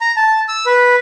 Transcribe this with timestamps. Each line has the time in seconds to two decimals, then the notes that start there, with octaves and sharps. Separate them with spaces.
0.01 A#5
0.16 A5
0.48 E6
0.66 B4